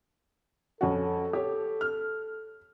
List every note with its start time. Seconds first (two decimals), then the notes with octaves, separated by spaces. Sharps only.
0.81 F2 C#4 F#4 A4
1.33 G4 C#5
1.81 F6